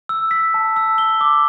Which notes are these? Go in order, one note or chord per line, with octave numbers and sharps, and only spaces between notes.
E6
B6
A5
E6
G7
D6